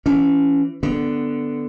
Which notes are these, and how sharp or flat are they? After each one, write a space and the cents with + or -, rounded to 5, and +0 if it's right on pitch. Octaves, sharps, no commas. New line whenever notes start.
E3 +25 C#4 +15
D3 +0 B3 +0